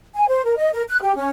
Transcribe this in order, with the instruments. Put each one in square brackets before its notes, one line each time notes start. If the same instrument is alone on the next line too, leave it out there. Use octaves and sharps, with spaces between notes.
[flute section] G#5
C5
A#4
D#5
A#4
F#6
G4
C#4